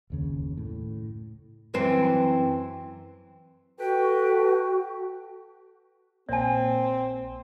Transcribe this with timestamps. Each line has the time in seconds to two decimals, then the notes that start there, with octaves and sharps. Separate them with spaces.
0.10 F#1 D#2 C#3
0.57 A2
1.74 F#2 E3 C4
3.80 F#4 A4 B4 G5
6.29 A#1 A#3 C4 C#5 G#5